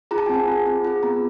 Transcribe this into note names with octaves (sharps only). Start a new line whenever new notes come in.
F4 G#4 A#5
A5
G#5
C4 A5
F4 G#4
C4
F4 G#4
B3 A#5